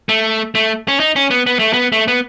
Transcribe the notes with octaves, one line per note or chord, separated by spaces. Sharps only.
A3
A3
C#4
D#4
C#4
B3
B3
A3
B3
A3
B3